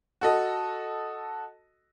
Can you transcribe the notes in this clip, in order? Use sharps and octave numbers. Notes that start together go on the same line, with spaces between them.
F#4 A4 D#5